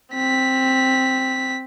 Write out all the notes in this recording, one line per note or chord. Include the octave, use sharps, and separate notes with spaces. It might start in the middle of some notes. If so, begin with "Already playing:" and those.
C4 B6